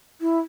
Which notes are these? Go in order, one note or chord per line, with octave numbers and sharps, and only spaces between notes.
E4